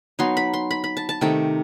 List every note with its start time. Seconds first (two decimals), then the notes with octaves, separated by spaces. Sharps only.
0.19 F#3 B3 D#4 C6
0.37 B5
0.54 C6
0.71 B5
0.84 B5
0.97 A5
1.09 A5
1.21 C3 D#3 A3 D#4 G5